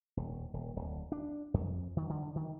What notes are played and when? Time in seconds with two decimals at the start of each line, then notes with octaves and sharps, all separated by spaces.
0.17 D#1
0.54 D#1
0.76 D1
1.12 D4
1.54 F2
1.97 D#3
2.09 D3
2.35 D#3